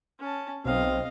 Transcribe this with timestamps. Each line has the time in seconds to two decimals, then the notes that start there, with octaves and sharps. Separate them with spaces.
0.20 C#4 A5
0.65 B1 C4 D#5 F5